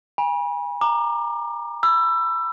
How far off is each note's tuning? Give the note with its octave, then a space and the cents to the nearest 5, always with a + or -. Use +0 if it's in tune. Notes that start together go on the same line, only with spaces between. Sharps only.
G#5 -30 B5 -35
A#5 +0 D6 +30
B5 +0 E6 +25